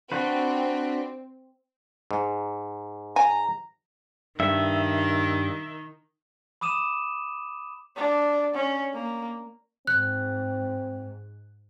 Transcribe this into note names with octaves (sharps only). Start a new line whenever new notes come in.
C4 D4 F#4 B4
G#2
G#5 A#5
G2 D#3 E5
B5 D6 D#6 D#7 E7
D4
C#4
A#3
G#2 C4 F#6